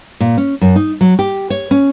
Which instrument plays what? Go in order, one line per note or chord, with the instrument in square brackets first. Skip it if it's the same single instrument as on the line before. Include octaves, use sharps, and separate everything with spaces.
[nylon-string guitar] A#2
C#4
F#2
D#4
F#3
G4
C#5
C#4